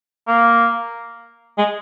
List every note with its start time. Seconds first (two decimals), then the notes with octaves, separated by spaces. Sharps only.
0.28 A#3
1.58 G#3